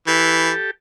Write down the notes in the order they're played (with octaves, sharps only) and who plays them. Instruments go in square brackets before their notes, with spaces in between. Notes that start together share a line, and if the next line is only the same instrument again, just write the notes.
[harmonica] E3 [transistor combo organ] G4 A4